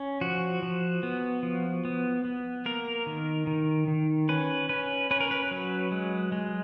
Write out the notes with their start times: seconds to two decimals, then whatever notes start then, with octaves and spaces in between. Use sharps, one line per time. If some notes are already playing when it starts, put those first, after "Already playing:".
Already playing: C#4
0.21 F3 F#4
0.62 F3
1.03 B3
1.43 F3
1.85 B3
2.25 B3
2.66 A#3 A#4
3.06 D#3
3.47 D#3
3.88 D#3
4.29 C#4 B4
4.69 C#4 B4
5.11 C#4 B4
5.20 A#4
5.31 B4
5.51 F#3
5.92 G#3
6.32 G#3